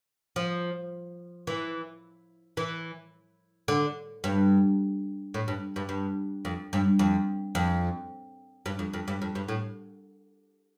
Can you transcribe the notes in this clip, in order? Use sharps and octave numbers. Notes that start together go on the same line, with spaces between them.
F3
E3
E3
D3
G2
A2
G2
G2
G2
F2
G2
F2
F2
G2
F2
F2
G2
F2
G2
A2